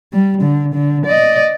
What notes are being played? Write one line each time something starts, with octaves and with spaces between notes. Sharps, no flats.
G3
D3
D3
D5 D#5